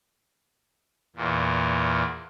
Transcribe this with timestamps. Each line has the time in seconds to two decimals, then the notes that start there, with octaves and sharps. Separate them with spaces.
1.16 E2 A#2